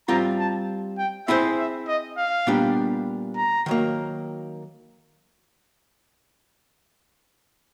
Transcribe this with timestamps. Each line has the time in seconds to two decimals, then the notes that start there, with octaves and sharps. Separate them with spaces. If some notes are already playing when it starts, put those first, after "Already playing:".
0.08 G3 C4 F4 A#5
0.39 A5
0.98 G5
1.27 C4 E4 G#4 C5 E5
1.58 E5
1.88 D#5
2.17 F5
2.47 A#2 G3 B3 D4 G4
3.36 A#5
3.66 D#3 F#3 A#3